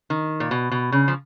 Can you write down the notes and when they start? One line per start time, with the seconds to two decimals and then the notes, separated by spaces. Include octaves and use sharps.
0.10 D#3
0.40 A#2
0.51 B2
0.71 B2
0.92 C#3
1.08 F3